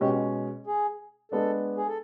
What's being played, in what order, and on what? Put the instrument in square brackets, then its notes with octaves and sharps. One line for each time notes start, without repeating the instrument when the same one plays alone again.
[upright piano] B2 G#3 C#4 [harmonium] G4
[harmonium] G#4
[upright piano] G#3 B3 D4 [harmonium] A4
[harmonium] G#4
A4